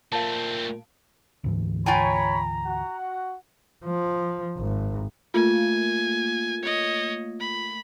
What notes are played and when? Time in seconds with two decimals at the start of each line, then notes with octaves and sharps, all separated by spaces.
0.12 A#2 A3 C4 F5 A5
1.44 D2 G#2 E3
1.86 F4 C#5 G5 G#5 A#5 B5
2.65 F#4 F#5
3.85 F3
4.58 G#1
5.34 A3 A#3 F4 G#5
6.62 C#5 D#5
7.40 B5